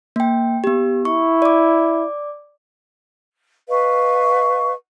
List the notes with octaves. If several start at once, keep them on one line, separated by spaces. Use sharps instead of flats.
A#3 G5
B3 G4
E4 C#6
D5 D6
B4 D#5 F5 C#6